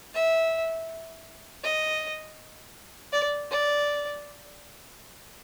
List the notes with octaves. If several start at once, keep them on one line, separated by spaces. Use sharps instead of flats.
E5
D#5
D5
D5